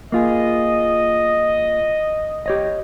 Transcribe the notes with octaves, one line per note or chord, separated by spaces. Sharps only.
A#3 F4 G#4 D#5
G4 C#5 D#5